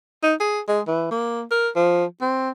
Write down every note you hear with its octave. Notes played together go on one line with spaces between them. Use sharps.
D#4
G#4
G#3
E3
A#3
A#4
F3
C4